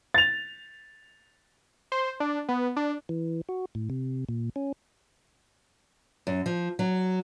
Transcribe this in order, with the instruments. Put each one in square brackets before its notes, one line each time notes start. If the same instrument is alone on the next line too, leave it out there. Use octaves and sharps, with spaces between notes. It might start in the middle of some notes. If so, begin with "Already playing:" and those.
[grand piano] A6 F7
[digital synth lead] C5
D4
B3
D4
[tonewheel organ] E3
F#4
A2
C3
A#2
C#4
[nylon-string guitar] F#2
F3
F#3